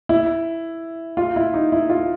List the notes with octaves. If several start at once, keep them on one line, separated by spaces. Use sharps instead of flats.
E4
F4
E4
D#4
E4
F4